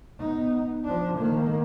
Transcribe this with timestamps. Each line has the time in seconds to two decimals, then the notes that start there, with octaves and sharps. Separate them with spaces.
0.20 B3 D#4
0.85 F3 D4
1.18 D#3 A#3